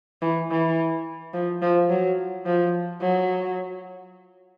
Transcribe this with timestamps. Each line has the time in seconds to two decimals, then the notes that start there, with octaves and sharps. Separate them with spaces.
0.22 E3
0.51 E3
1.34 F3
1.62 F3
1.90 F#3
2.46 F3
3.01 F#3